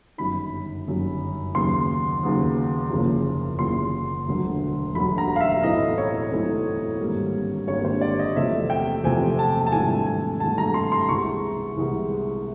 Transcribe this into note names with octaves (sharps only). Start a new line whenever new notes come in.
G1 F#2 D#3 B5
G1 F#2 D#3
D#2 C#3 F#3 B3 C6
D#2 C#3 F#3 B3
F#1 E2 C#3 F3
F#1 E2 C#3 F3 C6
E1 D2 D3 F#3
E1 D2 D3 F#3 B5
A#5
F5
E5
B1 A2 E3 A3 C4 D#5
C#5
B1 A2 E3 A3 C4
G#1 G2 D3 G3 A#3
G#1 G2 D3 G3 A#3 C#5
C5
D5
D#5
E2 C3 F3 A3 C4 E5
G5
E2 C3 F3 A3 C4 G#5
A5
A5
G#1 G2 E3 A3 G#5
G#5
G#1 G2 E3 A3 A5
A#5
C6
C6
C2 C3 E3 G#3 B3 C#6
C2 C3 E3 G#3 B3